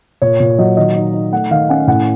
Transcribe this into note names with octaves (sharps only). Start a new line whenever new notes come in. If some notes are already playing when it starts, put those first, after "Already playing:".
A#2 C#5
A#2
F#3 D#5
D#3 D#5
D#4
D#4
A3 F#5
D#3 F5
C#4 F#5
A2 F#5